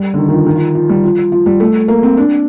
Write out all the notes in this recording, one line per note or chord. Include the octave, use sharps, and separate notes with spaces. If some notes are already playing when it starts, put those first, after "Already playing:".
Already playing: G3
D3
D#3
D#3
F3
D#3
F3
F3
G3
F3
F3
G3
A3
A#3
C4
D4